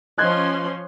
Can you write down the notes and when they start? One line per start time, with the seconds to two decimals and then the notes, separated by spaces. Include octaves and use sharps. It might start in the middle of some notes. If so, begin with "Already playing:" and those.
0.18 F3 C#4 D#5 C6 F#6 G#6